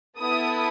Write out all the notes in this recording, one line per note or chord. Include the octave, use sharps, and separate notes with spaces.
B3 E4 A4 D#6